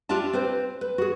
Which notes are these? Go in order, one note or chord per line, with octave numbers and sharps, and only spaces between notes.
D4 F4 G4 E5 A5
C4 B4 C5
B4
F#4 G#4